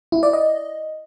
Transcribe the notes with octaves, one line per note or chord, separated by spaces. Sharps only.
E4
D5
D#5